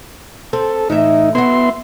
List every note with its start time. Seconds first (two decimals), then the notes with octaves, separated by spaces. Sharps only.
0.53 C4 A4
0.90 A2 E3 D#4 E5
1.35 B3 E4 F#4 C6